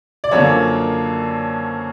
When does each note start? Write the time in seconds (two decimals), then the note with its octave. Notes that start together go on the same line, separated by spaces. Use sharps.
0.24 D5
0.31 F#2 D3 F3 A#3 C#5